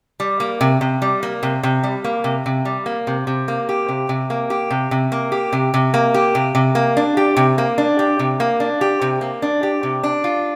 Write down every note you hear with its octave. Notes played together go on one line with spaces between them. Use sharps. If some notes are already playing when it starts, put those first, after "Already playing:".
G3
A#3
C3
C3
G3
A#3
C3
C3
G3
A#3
C3
C3
G3
A#3
C3
C3
A#3
G4
C3
C3
A#3
G4
C3
C3
A#3
G4
C3
C3
A#3
G4
C3
C3
A#3
D4
G4
C3
A#3
D4
G4
C3
A#3
D4
G4
C3
A#3
D4
G4
C3
D4
F4